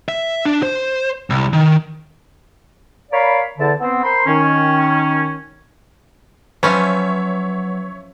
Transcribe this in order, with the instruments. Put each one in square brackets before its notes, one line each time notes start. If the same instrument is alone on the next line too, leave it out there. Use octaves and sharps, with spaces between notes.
[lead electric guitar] E5
D4
C5
C2
D#3
[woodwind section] A#4 C#5 D5 F5 B5
E2 D3 A5
B3 C4
A#4 C5 B5 C6
D#3 C#4
[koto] F3 C#4 [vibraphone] F#3 [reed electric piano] B4 [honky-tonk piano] C#5 E5